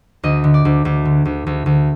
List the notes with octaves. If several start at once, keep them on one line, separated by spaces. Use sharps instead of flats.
D2 D#5
D3
D5
D2
D2
D3
D2
D2
D2